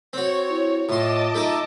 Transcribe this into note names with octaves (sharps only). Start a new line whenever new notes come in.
C4 F#4 C#5
E4
A2 F4 D#5 A5 C6 D6
A3 D#4 A4